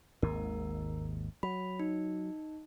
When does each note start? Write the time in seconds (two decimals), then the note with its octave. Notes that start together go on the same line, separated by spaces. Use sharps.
0.23 G#1 D#2 G#2 A#4
1.43 F#3 B5
1.80 D#4